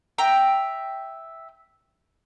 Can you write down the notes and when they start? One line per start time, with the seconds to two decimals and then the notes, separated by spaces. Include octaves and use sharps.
0.18 E5 G5 A#5